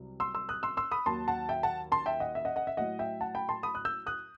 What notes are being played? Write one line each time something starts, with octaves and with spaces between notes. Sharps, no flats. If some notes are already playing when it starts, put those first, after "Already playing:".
Already playing: C2 C3 F#3
C6 E6
C6 E6
D#6 F#6
C6 E6
C6 E6
B5 D#6
D#2 D#3 F#3 A5 C6
F#5 A5
E5 G5
F#5 A5
A5 C6
E5 G5
D#5 F#5
E5
D#5 F#5
D#5 F#5
E5
A2 F#3 D#5 F#5
E5 G5
F#5 A5
G5 B5
A5 C6
B5 D#6
D#6 F#6
E6 G6
D#6 F#6